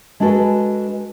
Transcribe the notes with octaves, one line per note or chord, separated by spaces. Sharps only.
G#3 D4 F#4 A4 B4